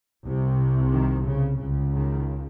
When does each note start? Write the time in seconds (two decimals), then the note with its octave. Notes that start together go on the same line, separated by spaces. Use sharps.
0.25 C2 C3
0.92 D#3
1.26 C#3
1.60 C#2 C#3
1.94 D#3